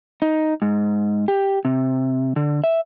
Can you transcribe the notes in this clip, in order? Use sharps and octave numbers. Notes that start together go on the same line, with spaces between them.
D#4
G#2
G4
C3
D3
E5